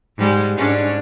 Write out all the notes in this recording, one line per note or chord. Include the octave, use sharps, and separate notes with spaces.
G#2 G3 G#3
G#2 C#4 D4